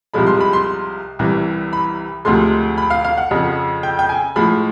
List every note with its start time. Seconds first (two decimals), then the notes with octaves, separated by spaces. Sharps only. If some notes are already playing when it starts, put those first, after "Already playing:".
0.14 C2 C3 F3 G#3 B5
0.27 C6
0.40 B5
0.53 C6
1.19 C2 C3 E3 G3
1.73 B5
2.25 D2 C3 F3 G#3 C6
2.78 B5
2.90 F5
3.05 F5
3.18 F#5
3.31 F2 C#3 F3
3.83 G5
3.99 G5
4.09 G#5
4.36 A2 F3 G#3 B5